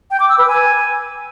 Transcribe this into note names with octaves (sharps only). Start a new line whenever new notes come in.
G5
D6
E6
B4
G#5